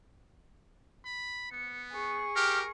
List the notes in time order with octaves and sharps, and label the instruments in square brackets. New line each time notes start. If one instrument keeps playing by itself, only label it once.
[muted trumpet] B5
[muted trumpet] B3 [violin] C#7
[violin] G#4 C#6
[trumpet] G4 [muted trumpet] A#4 [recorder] F6